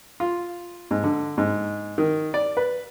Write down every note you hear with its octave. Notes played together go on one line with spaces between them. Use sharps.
F4
G#2
D3
G#2
D#3
D5
B4